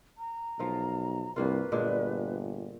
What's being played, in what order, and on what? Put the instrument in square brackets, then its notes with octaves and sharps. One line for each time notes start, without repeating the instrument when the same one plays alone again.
[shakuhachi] A#5
[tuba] B1 [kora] F3 F4 A#4
[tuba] C2 [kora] G2 A#3 F4 [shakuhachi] B4
[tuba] G1 [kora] A#2 G#3 D4